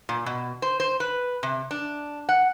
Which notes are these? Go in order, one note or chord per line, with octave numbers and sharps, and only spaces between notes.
A#2
B2
C5
C5
B4
C3
D4
F#5